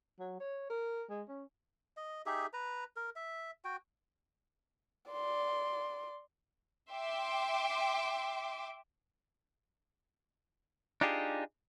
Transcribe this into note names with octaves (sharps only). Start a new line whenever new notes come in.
F#3
C#5
A#4
G#3
C#4
D#5
D#4 G4 G#4 E5
B4 A#5
A#4
E5
F#4 G5
D5 C6
E5 G5 C6 D6
D4 D#4 F4 G4 G#4